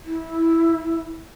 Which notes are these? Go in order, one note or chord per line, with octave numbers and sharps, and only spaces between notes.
E4